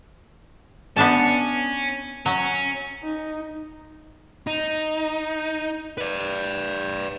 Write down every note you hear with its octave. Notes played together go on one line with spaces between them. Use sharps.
B3 C#4 D4 A5
F#3 C#4
D#4
D#4
B4 D5